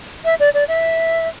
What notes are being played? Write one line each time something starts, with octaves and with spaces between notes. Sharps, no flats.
E5
D5
D5
E5